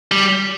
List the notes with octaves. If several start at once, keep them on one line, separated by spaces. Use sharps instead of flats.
G3